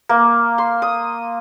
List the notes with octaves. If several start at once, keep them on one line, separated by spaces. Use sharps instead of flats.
A#3
C6
D#6